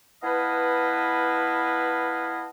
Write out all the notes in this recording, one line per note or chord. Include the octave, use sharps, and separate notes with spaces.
B3 E4 B4 D#5 F5 A5